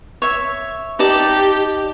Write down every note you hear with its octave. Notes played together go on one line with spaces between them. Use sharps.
C#5 E5
D#4 G4 D5 A5